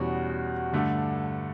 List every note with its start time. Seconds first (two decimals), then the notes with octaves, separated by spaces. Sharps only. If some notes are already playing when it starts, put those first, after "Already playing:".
Already playing: E2 B2 G3 C#4 F#4
0.73 G2 D3 A3